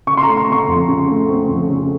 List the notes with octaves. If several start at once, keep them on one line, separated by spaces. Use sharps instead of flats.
C#3 C#6
C6
A3 A#5
C6
C4 C#6
F2
C#3
A3
C4
F2
C#3